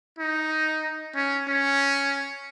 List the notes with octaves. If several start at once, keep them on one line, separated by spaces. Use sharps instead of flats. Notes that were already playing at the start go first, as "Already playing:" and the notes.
D#4
C#4
C#4